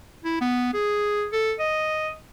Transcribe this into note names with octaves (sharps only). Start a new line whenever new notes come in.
E4
B3
G#4
A4
D#5